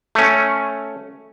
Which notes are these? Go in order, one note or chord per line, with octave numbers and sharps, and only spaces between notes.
A3 C#4